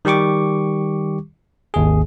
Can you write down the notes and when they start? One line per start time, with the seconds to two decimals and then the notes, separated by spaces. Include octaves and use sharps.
0.05 D#3 G3 G4 C#6 D6
1.74 G#1 D#2 G#4